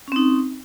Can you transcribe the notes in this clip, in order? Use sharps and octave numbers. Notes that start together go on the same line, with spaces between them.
C4 C#4 D#4